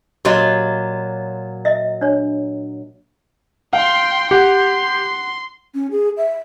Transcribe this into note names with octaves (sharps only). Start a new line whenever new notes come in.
A#2 F#3 F4 G4 D#5
D#5 E5
D4 C#5
F5 G5 C6
G4 F#5 C6
C#4
G#4
E5